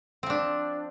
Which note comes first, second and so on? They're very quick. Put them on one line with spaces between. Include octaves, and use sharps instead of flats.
C4 F3 D4